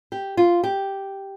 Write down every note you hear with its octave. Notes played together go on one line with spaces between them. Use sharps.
G4
F4
G4